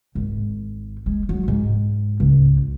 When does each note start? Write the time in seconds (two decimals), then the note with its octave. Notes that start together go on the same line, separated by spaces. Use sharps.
0.15 G#1
1.06 G#3
1.29 F#3
1.48 G#2
2.20 C#2